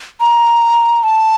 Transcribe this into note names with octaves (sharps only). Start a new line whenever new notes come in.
A#5
A5